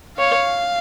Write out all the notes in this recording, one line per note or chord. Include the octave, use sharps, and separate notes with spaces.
C#5 F5